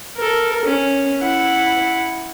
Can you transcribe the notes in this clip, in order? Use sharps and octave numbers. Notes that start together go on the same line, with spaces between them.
A4 A#4
C#4
E4 F#5